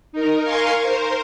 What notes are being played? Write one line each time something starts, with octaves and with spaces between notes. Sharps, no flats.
D#4 A#4
A#4 F5 G#5 C6 C#6
A#4 C5